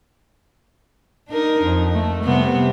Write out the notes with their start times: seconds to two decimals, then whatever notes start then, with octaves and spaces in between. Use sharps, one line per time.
1.29 D4 D#4 A#4
1.63 F2
1.94 A3
2.24 C3 G3 B3